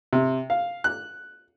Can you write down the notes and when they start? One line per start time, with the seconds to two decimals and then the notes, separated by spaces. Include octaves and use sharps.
0.13 C3
0.50 F5
0.84 F#6